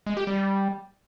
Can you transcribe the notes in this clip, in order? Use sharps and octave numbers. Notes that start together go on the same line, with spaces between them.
G#3
G4
G3